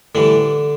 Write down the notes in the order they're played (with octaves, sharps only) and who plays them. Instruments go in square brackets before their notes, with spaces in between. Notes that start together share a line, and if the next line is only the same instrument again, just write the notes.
[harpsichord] A2 D3 E3 G3 D4